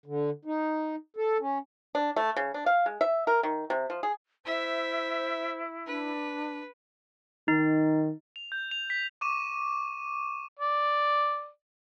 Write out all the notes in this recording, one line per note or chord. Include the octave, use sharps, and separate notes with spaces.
D3
D#4
A4
C#4
D4
A3
C#3
D4
F5
G#3
E5
A#4
D#3
C3
F3
G#4
E4 C5 E5
D4 B4
D#3 D#4
F7
G6
F7
B6
C#6 D6 D#7 E7
D5